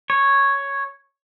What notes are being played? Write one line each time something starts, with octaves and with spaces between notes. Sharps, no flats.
C#5